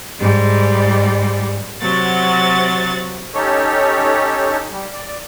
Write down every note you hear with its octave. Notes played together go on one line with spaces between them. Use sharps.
G#2 G3
C3 F#3 F#4 A6
C#4 D#4 G4 A4 C#5
G3
D5